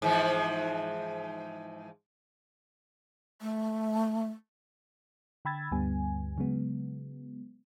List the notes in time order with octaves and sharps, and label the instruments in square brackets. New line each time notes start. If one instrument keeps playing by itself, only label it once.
[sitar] G#2 E3 F3
[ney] A3
[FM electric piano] D3 G5 B5 E6 G#6 A6
D2 G2 D3 G3 B3 G#5
C#3 F#3 G#3 B3